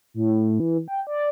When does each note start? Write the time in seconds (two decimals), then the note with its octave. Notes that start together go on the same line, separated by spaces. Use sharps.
0.14 A2
0.60 E3
0.88 G5
1.07 D5